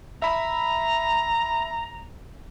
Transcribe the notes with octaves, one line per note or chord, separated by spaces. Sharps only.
E5 A#5 B5